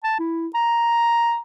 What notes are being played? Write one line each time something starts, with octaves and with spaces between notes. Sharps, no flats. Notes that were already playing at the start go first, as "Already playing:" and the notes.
A5
E4
A#5